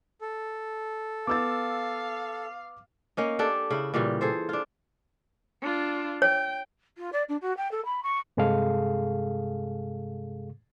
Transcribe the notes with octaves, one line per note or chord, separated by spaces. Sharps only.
A4
B3 F5 D6 E6 A6
A#3 C#4 D#4
D4 G4 A4
C#3 E4
A#2 C#3 E3 G3
G#4 A4 C5
D4 F4
D4 F4
C#5 G5
F4
D5
D4
F#4
G5
A4
B5
C#6
G2 C3 G#3 G#4 A4 F5